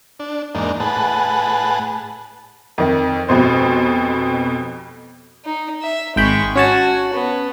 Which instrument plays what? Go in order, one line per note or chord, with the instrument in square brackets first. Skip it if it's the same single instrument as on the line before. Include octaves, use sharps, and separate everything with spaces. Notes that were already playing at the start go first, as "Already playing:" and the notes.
[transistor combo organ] D4
E2 G#2 A#3 D4 D#4
A2 G#4 B4 F#5 A5
[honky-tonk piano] F2 D#3
F1 F2 B2 C5
[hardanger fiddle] D#4
E5
[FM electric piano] G#1 G5 B5 [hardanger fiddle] G#3 C#6
[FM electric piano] C#4 C#5 A5 [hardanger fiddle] F#4
[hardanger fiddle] B3